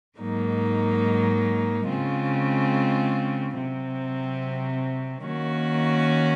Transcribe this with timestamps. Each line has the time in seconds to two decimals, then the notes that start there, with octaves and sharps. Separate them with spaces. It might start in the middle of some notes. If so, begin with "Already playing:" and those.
0.18 G#2 F#3 A#3 D#4
1.87 C#3 G#3 C4 F4
3.56 C3 F#3 C4
5.25 D#3 A#3 C#4 F#4